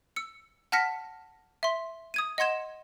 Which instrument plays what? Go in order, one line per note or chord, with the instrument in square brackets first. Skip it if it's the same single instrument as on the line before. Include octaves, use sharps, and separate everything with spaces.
[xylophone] E6 C#7
F#5 A5 F6 A#6 B6 C#7
E5 C6
D#6 G#6 D#7
D#5 F#5 C6 G#6 E7